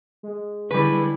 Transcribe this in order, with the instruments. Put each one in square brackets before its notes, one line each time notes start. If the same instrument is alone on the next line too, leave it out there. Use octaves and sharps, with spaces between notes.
[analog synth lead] G#3
[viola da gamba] D3 E4 [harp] G3 C#4 [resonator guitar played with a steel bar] B4